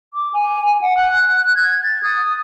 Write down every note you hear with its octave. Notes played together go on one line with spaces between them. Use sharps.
D6
G#5
G#5
F#5
F#6
F#6
G#6
A6
D#6